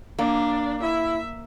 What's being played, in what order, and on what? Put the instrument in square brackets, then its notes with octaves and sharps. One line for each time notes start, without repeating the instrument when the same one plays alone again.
[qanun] A#3 [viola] D4
[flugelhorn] E4 [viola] E5